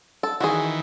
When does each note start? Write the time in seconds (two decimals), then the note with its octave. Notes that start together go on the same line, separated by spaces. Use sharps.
0.23 A4
0.40 D#3 E3 F#4 G#4